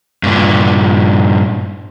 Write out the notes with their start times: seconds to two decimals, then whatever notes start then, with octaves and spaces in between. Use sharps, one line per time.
0.23 G2 A#2